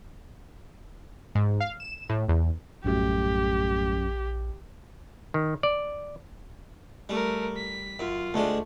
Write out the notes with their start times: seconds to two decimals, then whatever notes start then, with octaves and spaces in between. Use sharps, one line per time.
1.35 G#2
1.60 F5
1.80 E7
2.10 A2
2.29 E2
2.84 A#1 F#2 A2 G3 A3 G4
5.34 D#3
5.63 D5
7.09 G3 A3 A#4
7.57 B6
7.99 F#2 F4
8.34 D2 G#3 A3 D4